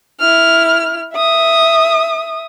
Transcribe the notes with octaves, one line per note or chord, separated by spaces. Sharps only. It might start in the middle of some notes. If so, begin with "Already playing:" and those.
E4 F6
E5 D#6